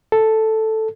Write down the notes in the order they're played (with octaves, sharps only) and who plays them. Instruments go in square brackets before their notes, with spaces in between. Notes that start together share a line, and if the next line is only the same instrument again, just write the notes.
[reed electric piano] A4